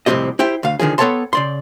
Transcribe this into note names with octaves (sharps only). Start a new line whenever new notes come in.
C2 F2 A2 C4 G4 D#5
E4 G4 C5 G5
D2 F5
D3 D#3 F3 G#4
B3 A4 C#5 G5 A5 C6
C#3 D5 C6